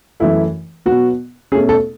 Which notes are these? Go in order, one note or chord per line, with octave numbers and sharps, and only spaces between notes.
F#2 E3 A3 E4
B2 F#3 B3 F#4
B2 A3 C#4 G#4
A4